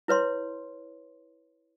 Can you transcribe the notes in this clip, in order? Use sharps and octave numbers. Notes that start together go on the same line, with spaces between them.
E4 B4 C#5 C6